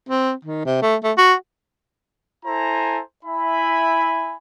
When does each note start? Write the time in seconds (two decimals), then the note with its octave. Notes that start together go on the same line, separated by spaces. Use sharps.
0.09 C4
0.45 D#3
0.66 C3
0.83 A3
1.04 A3
1.18 F#4
2.46 E4 A4 C5 G#5 A#5
3.25 E4 E5 G#5 B5